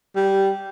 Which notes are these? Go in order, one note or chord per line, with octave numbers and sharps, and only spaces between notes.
G3